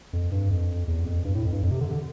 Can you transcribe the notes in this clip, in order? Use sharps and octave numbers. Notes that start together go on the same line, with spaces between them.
F2
G2
F2
E2
F2
G2
A2
F2
G2
F2
C3
D3
D3